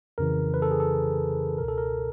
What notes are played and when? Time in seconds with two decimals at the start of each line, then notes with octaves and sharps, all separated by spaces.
0.18 F2 C#3 E3 A#4
0.54 B4
0.62 A4
0.71 G#4
0.80 A4
1.58 C#2 B2 A#4
1.68 A4
1.78 A#4